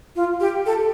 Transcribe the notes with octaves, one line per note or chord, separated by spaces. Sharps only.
F4
G4
A4